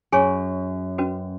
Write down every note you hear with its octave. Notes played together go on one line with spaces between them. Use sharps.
F#2 G#4 C#5 G#5 C#6
C#4 F#4 B4